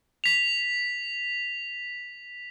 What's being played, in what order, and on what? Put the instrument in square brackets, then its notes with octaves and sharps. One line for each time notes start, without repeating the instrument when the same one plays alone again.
[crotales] B6 F7